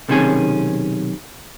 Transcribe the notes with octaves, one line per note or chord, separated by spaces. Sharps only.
B1 C3 D#3 C#4 G#4